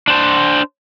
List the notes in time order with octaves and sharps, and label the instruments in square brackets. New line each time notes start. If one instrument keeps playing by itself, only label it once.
[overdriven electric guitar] D4 C5